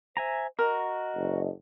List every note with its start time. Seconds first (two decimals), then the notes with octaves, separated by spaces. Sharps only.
0.17 C5 E5 G#5 A#5
0.59 F#4 A#4 D#5
1.15 F#1